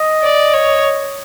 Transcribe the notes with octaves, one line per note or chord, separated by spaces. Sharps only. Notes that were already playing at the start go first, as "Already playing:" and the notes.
Already playing: D#5
D5
C#5